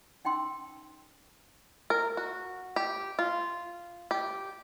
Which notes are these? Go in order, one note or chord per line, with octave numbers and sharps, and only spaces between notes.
C#4 D#4 G5 C6 E6
A#4
F#4
G4
F4
G4